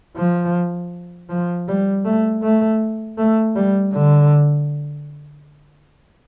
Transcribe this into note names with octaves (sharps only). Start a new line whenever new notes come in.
F3
F3
G3
A3
A3
A3
G3
D3